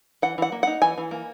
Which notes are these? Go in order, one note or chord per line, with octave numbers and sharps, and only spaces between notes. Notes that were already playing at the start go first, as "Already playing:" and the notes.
E3 F#5
E3 F#5
A#3
D#4 F#5
E3 G#5
E3
A#3